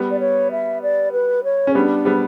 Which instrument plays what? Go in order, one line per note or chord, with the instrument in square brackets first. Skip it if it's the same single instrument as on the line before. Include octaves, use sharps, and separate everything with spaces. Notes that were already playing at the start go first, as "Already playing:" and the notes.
Already playing: [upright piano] G3 B3
[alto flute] D5
C#5
E5
D5
B4
C#5
[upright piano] C#4
[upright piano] G3 B3 [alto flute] D4
[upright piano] G3 B3